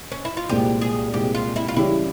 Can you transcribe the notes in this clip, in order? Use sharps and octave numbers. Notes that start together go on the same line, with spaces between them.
C#4
E4
F4
C2 A#2 G#3 C4 G4
G#4
C2 A#2 G#3 C4 G4
F4
E4
F4
C#3 E3 G3 C#4 E4 G4